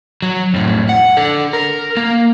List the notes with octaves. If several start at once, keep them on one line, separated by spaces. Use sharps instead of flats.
F#3
F2 A2
F#5
D4 A4
A#4
A#3